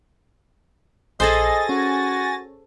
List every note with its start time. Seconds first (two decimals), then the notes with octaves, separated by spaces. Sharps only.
1.20 A#1 G#4 A4 C5 D#5 G#5 A6 A#6
1.69 C#4 F#4